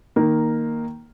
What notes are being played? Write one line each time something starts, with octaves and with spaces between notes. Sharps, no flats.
D#3 A#3 D#4 A#4